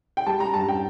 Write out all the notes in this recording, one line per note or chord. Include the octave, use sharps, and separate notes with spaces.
G5
G3 A5
A#5
G2 A5
G5